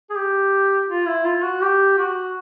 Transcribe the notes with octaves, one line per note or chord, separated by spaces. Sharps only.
G#4
G4
F4
E4
F4
F#4
G4
F#4